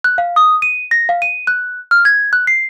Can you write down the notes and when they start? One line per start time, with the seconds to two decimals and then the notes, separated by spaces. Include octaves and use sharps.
0.04 F#6
0.18 F5
0.36 D#6
0.62 D#7
0.91 A#6
1.09 F5
1.22 D#7
1.47 F#6
1.91 F6
2.05 G#6
2.33 F#6
2.47 C7